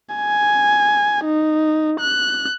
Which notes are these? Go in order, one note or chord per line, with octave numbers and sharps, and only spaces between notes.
G#5
D#4
F#6